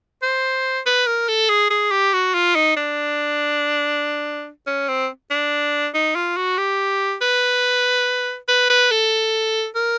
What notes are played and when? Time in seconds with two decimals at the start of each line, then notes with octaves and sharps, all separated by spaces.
0.23 C5
0.86 B4
1.07 A#4
1.28 A4
1.49 G#4
1.70 G#4
1.91 G4
2.13 F#4
2.34 F4
2.55 D#4
2.77 D4
4.67 C#4
4.89 C4
5.31 D4
5.94 D#4
6.15 F4
6.37 F#4
6.58 G4
7.22 B4
8.48 B4
8.70 B4
8.91 A4
9.76 A#4